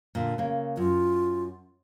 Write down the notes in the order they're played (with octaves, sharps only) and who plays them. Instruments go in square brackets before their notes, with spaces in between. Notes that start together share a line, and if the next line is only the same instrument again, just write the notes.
[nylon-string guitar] A#2 D3
C#3 A#3
[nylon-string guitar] F#2 [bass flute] F4